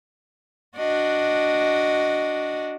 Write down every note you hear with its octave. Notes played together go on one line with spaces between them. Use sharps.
D4 F#4 D#5